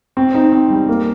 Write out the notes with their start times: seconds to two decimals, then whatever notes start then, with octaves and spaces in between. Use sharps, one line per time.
0.17 C4
0.34 D#4
0.53 C4
0.70 G3
0.89 A#3